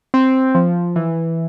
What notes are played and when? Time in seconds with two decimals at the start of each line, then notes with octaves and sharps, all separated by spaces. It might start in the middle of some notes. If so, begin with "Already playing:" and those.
0.14 C4
0.55 F3
0.96 E3